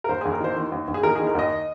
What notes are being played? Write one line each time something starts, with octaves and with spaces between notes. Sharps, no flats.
A#4
D#2 C5
G#4
D#2
A#4
D#3 C5
D#3
D#2
D#2
G#4
D#3 A#4
G#4
D#3
A#4
D#2 D#5